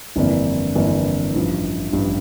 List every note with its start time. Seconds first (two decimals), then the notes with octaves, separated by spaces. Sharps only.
0.16 G1 F2 E3 A#3 D4
0.75 G1 F2 E3 A#3 D4
1.34 A1 G2 F3
1.92 A1 G2 F3